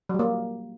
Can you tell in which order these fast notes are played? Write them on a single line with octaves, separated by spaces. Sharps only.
F#3 G3 A#3